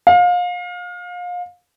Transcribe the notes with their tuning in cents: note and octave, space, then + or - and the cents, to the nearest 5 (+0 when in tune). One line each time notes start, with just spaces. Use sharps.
F5 +30